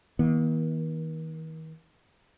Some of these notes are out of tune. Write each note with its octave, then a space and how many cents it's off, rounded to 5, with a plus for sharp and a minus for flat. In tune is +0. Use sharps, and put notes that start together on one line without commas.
D#3 +45 A#3 +45